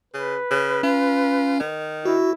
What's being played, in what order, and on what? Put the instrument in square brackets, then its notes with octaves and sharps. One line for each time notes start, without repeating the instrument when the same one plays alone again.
[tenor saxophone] C#3 [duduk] B4
[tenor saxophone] C#3
[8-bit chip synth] C#4 [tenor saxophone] F4
[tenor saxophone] D#3
[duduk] E4 [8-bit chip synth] F#4